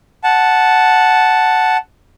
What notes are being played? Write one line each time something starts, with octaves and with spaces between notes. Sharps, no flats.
F#5 A5